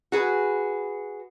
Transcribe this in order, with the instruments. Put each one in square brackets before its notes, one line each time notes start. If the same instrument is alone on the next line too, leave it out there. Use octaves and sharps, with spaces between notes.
[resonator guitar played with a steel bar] F#4 G#4 B4